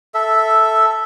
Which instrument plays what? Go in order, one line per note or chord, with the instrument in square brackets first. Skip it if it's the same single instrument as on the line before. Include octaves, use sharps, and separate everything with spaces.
[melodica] A4 E5